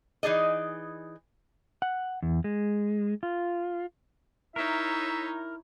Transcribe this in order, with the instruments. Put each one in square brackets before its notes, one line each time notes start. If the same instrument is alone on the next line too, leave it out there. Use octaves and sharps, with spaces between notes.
[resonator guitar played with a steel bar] E3 D#4 G#4 D5 D#5
[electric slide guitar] F#5
E2
G#3
F4
[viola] D#4 C#5 [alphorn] E4 [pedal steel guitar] A#4 [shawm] E5